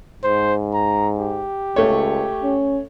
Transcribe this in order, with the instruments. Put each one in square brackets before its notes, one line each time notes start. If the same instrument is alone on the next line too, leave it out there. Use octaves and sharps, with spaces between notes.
[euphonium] G#2 [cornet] C5
[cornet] A#5
G4
[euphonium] C#2 [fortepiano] A3 C#5
[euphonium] C#4